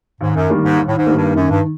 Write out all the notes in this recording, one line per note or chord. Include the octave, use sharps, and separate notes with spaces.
D#2 G#2
F#2
D#3 G3 A#3
G#2
D#2
A2
G#2
D#3 G3 A#3
G2
F#2 D#3
G2